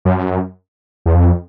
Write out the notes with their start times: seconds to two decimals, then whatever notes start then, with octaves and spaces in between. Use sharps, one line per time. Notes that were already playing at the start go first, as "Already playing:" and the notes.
0.05 F#2
1.06 E2
1.15 F2